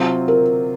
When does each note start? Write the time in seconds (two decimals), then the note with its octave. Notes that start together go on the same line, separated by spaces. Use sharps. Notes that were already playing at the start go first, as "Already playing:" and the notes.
Already playing: C3 F#3 C4 F4
0.28 A#4